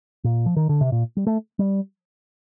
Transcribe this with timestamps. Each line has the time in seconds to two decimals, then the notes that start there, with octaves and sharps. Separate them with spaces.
0.24 A#2
0.46 F3
0.56 D#3
0.69 D3
0.81 C3
0.92 A#2
1.17 G3
1.27 A3
1.59 G3